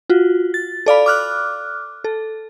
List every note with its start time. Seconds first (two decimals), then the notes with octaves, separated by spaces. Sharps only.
0.10 F4 F#4
0.54 A6
0.86 A4 D5 F5 B5
1.06 D6 F6 F#6
2.04 A4